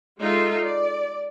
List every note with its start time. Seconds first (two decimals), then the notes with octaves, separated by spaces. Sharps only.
0.20 G#3 D#4 F4 A4 E5
0.61 D5